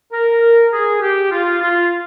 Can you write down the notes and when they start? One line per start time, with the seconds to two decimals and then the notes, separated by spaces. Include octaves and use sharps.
0.13 A#4
0.73 G#4
1.02 G4
1.31 F4
1.61 F4